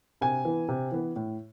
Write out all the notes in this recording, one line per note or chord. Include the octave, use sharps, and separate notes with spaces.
C3 G#5
E3 B3
C3
E3 B3
A2